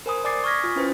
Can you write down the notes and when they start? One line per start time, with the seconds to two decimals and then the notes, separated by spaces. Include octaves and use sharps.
0.06 A#4 C5 G#5 B5 D#6
0.24 D5 G#5 D6 A6 C7 C#7
0.44 C#6 D#6 F6 G#6 A#6 B6
0.64 F4
0.76 C#4 E4 B4 C5 A6